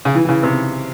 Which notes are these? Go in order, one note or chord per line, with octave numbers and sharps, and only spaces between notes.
C#3
E3
E3
C#3
C3